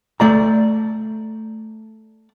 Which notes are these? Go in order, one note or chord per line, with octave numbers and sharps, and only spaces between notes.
A3 D5 A#5